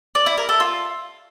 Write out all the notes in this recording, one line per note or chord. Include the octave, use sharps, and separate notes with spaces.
D5
E4
A#4
A4
F4